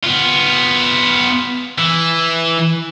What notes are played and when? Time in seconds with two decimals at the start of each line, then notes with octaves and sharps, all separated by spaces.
0.04 B3 F4
1.78 E3